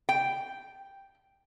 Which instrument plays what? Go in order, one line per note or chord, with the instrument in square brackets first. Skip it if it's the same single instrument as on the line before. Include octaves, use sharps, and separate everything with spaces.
[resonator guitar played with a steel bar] G5